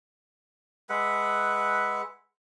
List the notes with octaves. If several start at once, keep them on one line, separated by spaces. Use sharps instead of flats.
G#3 B4 E5 F#5